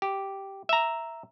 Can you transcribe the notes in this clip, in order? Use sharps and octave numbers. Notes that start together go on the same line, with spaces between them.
G4
E5 A#5